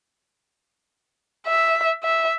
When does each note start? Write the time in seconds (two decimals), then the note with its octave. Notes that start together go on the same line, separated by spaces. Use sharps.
1.48 E5
2.04 E5